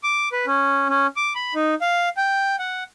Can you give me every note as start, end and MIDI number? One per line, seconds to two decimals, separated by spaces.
0.04 0.29 86
0.32 0.46 71
0.46 0.88 61
0.89 1.07 61
1.16 1.33 86
1.35 1.54 83
1.55 1.75 63
1.81 2.09 77
2.17 2.56 79
2.59 2.84 78